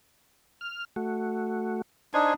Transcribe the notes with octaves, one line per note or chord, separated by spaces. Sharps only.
F6
A3 F#4
D4 D#4 C5 G#5